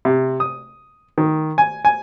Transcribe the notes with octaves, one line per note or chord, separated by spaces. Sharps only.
C3
D#6
D#3
G#5
G#5